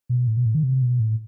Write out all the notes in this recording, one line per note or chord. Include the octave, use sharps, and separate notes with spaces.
B2
A2
B2
A2
D#3
C3
B2
A2